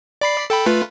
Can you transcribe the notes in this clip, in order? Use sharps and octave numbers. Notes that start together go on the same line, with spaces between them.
D5 B5 C7
A4 G5 B5
A3 F4 B4